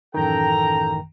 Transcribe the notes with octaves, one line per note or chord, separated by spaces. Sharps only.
A1 F#2 D#3 A4 G5 A#5